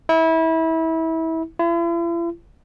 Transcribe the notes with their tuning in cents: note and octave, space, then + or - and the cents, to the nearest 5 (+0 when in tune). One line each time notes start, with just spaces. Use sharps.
E4 -25
E4 +45